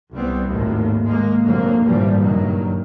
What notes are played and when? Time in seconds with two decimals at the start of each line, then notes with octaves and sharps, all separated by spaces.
0.12 C2 G3 B3 C4
0.47 G#1 D#2 A2
1.05 G#3 A#3
1.45 F1 F2 D3 F#3 A#3
1.84 G#1 G2 A#2 E3 F3 G3
2.18 F#1 G2 D#3 F#3